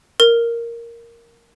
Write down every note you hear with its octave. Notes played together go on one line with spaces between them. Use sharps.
A#4